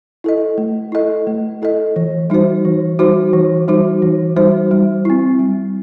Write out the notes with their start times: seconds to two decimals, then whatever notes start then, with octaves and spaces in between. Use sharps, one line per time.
0.24 E4 A4 D#5
0.58 A3
0.92 E4 A4 D#5
1.27 A3
1.62 E4 A4 D#5
1.96 E3
2.30 G3 D#4 F#4 C5
2.65 E3
2.99 G3 D#4 F#4 C5
3.33 E3
3.68 G3 D#4 F#4 C5
4.02 E3
4.36 G3 D#4 F#4 C5
4.71 G3
5.05 C4 E4
5.39 G3